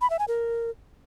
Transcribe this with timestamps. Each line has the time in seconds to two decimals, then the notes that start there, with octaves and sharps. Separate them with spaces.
0.01 B5
0.10 E5
0.19 G#5
0.28 A#4